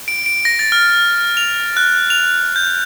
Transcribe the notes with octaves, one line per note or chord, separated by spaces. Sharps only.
D7
D7
A#6
A6
F6
F7
F#6
F7
G6